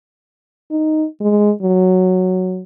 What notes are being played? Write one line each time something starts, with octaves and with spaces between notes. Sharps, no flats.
D#4
G#3
F#3